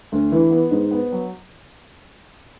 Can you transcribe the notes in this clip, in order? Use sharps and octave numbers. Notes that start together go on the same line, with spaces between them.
D2
E3
B3
G#2
B3
F#3